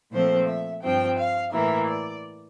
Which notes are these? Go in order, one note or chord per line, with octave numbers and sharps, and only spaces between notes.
A#2 F3 A3 C4 C5
E5
G2 F3 C4 G5
F5
A2 E3 A#3 E5
D5